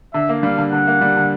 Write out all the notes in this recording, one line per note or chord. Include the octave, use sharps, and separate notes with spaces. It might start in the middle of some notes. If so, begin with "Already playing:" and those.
D3 E5
A#3
G3 F5
D3
D3 F#5
A#3
G3
D3